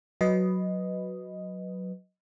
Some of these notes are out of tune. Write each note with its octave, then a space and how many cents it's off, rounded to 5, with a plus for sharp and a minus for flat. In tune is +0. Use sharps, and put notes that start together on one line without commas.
F#3 +0 B4 +5 D#5 +0